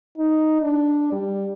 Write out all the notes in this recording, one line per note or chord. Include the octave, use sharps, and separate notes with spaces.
D#4
D4
G3